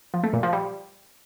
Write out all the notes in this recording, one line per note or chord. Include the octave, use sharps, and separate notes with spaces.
F3
A3
A#2
F3
G3